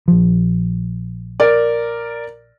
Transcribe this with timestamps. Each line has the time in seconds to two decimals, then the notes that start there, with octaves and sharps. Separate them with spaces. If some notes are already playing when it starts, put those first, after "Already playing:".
0.08 A#1 F3
1.40 A#4 D5